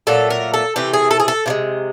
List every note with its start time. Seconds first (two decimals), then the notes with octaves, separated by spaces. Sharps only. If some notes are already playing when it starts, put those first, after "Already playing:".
0.07 A#2 F#3 A3 A4
0.30 A#4
0.54 A4
0.76 C3 E3 A3 G4
0.93 G#4
1.11 A4
1.20 G#4
1.28 A4
1.46 C3 F3
1.50 G#3